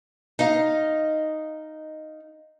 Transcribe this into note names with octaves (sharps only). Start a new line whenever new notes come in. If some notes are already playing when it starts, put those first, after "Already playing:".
D#4 D#5 F5